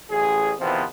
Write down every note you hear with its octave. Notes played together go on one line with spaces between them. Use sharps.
A1 G#4
E2 C3 D#3 F3 B3 C4